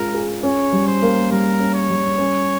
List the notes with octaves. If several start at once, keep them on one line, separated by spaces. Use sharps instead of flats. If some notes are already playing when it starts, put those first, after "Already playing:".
Already playing: G#3 C#4 F4 A#4
G#4
C#4 C#5
G3
C5
A#3
G3 A#4
C#4
C#5
G3
C#4